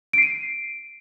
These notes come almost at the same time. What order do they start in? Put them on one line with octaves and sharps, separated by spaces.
D7 C7 D#7